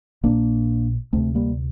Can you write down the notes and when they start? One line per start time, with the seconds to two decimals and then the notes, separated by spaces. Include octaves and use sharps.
0.23 A#1 A#2 A#3 D4
1.13 D2 C3 A3 C4
1.35 G3 A#3